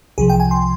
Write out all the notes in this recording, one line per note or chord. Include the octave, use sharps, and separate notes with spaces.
C2 C3 F3 G#4
G5
G#5
C6